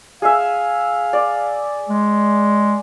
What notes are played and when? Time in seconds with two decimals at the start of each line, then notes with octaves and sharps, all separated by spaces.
0.22 G#4 E5 F5
1.13 D5
1.89 G#3